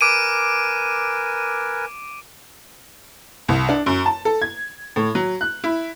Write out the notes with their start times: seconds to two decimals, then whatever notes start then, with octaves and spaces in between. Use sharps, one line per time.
0.01 A#4 B4 G#5 D6 D7 D#7
3.48 C2
3.69 D4
3.86 F#2
4.06 A5
4.25 A4
4.42 G#6
4.96 A2
5.15 F#3
5.41 F#6
5.64 E4